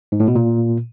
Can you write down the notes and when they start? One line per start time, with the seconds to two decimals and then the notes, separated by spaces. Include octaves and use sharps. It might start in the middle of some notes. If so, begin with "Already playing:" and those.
0.12 G#2
0.20 A2
0.28 B2
0.35 A#2